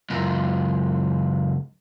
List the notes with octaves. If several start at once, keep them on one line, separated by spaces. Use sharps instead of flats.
C#2 F#2